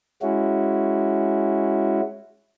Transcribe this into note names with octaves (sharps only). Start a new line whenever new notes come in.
G#3 C#4 E4 F#4